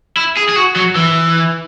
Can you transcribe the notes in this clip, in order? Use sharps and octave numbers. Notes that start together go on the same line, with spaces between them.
E4
G#4
G#4
F#4
F#3
E3